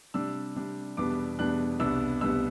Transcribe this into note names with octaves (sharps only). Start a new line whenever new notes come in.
C3 G3 D4 E6
C3 G3 D4
E2 B2 G3 B3 D4 D6
E2 B2 G3 B3 D4 F#6
C2 B2 G3 B3 D4 E6
C2 B2 G3 B3 D4 E6